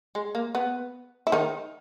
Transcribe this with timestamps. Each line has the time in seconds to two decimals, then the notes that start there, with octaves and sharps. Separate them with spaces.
0.15 G#3
0.35 A#3
0.55 B3
1.27 E4
1.32 D#3 D#4